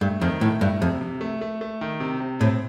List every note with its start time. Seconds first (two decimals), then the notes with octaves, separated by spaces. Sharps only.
0.01 G2 A3
0.21 F2 D#3
0.41 A2 A3
0.61 G2 A3
0.81 F2 C3
1.01 C3
1.21 A3
1.41 A3
1.61 A3
1.81 D#3
2.00 C3
2.20 C3
2.40 A2 C4